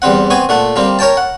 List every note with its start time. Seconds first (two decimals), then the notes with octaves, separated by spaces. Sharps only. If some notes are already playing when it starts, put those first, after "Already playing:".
0.02 E2 G3 C4 F#5
0.30 B3 C4 G#5 C#6
0.49 A#2 A3 F#5
0.76 G3 A#3 C4
0.99 A#4 C#5 G5 A5
1.17 F#5